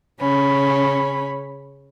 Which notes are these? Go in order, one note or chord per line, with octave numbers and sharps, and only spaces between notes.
C#3 C#4 B5